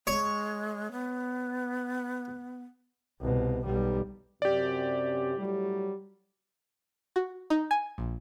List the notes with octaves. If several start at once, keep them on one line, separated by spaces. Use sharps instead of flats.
G#3 C#5 C#6
B3
C2 B2
B1 G3
F#2 C3 G4 D5
A2 F#3 G3
F#4
D#4
G#5
A#1